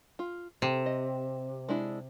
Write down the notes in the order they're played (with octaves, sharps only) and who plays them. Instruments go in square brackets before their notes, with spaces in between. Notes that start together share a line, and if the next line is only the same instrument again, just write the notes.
[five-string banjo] F4
[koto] C3 [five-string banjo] A4
[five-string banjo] D#5
G#3 D4 E4